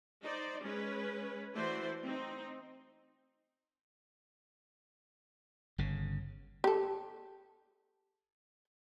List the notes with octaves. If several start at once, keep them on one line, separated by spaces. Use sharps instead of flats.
D#4 C5 D5
G#3 C#4 B4
E3 A3 E4 F#4 C5 D5
C4 D#4
G1 C#3
G4 A4